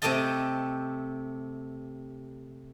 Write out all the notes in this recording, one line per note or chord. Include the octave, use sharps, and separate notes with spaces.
C3 A3 G4 A4 D#5 A5